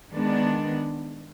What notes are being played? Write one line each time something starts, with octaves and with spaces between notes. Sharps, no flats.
D#3 G#3 B3 D4